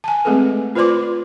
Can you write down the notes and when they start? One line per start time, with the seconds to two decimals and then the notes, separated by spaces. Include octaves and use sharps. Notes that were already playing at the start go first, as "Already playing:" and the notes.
0.04 G#5 A5
0.25 G#3 A3 C4 G#4 A4 B4
0.75 F4 B4 C5 D5 C6 D6